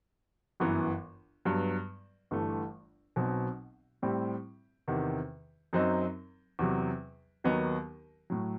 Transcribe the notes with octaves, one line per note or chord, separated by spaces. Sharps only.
G1 F#2 E3 B3
G2 F#3 B3
G1 G2 E3 A3
B1 B2 F#3 C4
A2 G3 C4 E4 G4
E2 C3 D#3
F#2 F#3 C4 D#4
E2 C3 F#3
D#2 D#3 F#3 B3 D#4
A2 F#3